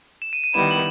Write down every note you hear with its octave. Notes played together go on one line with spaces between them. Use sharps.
E7
D#7
D#7
D#3 G3 B3 E4 E7
F#7